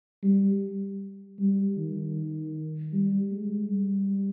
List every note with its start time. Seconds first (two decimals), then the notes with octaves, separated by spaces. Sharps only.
0.23 G3
1.39 G3
1.77 D#3
2.93 G3
3.31 G#3
3.70 G3